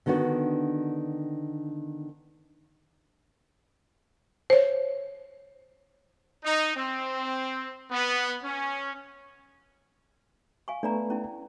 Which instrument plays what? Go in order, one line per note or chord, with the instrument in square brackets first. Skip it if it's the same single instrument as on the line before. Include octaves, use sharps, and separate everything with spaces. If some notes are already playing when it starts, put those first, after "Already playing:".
[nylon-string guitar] D3 D#3 B3 D4 F#4
[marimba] C5 C#5
[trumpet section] D#4
C4
B3
C#4
[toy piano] F5 G#5 C#6
[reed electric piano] A3 B3 B4 [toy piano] D4 D5 A#5
[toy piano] C#4 E4